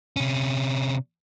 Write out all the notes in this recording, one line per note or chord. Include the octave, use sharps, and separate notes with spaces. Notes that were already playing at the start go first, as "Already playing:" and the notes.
C3 C#4